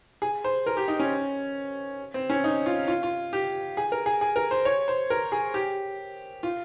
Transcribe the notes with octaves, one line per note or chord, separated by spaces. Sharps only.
G#4
C5
A#4
G4
D#4
C#4
C4
C#4
D#4
F4
F4
F4
G4
G#4
A#4
G#4
G#4
A#4
C5
C#5
C5
A#4
G#4
G4
F4